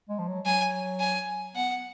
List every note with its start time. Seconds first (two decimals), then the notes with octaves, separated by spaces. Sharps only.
0.09 G#3
0.19 F3
0.28 F#3
0.45 F#3 G#5
1.00 G#5
1.55 B3 F#5